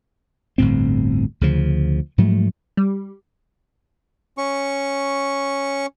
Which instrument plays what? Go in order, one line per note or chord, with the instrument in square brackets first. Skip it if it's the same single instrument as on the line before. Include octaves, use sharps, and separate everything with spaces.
[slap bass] G1 D2 A2 C4
D2 C#3 F3
G#2 F3 F#3 A3
[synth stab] G3
[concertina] C#4 C#6